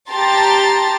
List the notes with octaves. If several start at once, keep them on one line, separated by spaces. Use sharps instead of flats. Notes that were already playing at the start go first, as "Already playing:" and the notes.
G4 A5 A#5 C6 A6